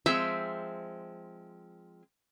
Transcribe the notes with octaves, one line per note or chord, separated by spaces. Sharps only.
F3 G#3 C4 E5